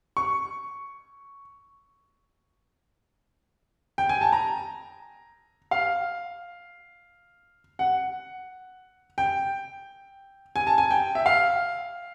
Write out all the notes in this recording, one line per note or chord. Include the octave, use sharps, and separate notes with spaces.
C#6
G5
G#5
A5
A#5
F5
F#5
G5
G#5
A5
G#5
G5
E5
F5